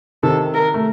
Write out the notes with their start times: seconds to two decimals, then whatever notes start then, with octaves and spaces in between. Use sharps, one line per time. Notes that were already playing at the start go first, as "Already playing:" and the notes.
0.23 C3 D#3 A4
0.54 A#4
0.74 A3